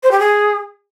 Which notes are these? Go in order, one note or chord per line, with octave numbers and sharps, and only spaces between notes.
C5
G4
G#4